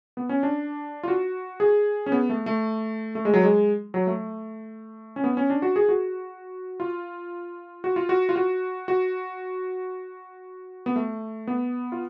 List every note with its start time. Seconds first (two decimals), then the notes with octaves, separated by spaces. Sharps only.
0.17 B3
0.29 C#4
0.43 D4
1.03 F4
1.08 F#4
1.60 G#4
2.06 C#4
2.12 B3
2.29 A3
2.46 A3
3.15 A3
3.25 G#3
3.34 F#3
3.43 G#3
3.94 F#3
4.07 A3
5.16 C#4
5.24 B3
5.37 C#4
5.50 D4
5.62 F#4
5.76 G#4
5.89 F#4
6.80 F4
7.84 F#4
7.96 F4
8.09 F#4
8.29 F4
8.36 F#4
8.88 F#4
10.86 B3
10.96 A3
11.47 B3
11.92 F4